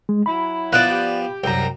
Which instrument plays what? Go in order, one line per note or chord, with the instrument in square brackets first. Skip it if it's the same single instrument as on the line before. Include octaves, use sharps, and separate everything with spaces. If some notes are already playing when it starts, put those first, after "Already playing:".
[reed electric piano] G#3
[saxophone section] F#3 E4 [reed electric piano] B5
[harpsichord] F3 B3 [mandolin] D5 F#6
[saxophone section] G4
[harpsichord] C2 F#2 [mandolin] G5 A#5